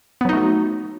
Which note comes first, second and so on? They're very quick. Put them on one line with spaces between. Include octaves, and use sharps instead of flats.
B3 F#3 D#4 A3 F#4